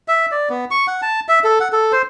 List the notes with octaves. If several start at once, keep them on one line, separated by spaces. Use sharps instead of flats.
E5
D5
B3
C#6
F#5
A5
E5
A4
F#5
A4
C5